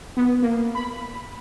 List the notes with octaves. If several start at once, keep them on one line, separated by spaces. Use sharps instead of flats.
B3
A#3
B5